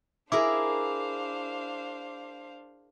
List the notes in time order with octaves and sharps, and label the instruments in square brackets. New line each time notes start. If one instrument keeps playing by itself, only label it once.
[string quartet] D4 C5 F5 [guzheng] E4 G#4 A#4 [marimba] E5 [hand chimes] D6